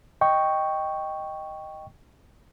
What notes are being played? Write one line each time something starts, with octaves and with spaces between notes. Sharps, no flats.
D#5 G5 C#6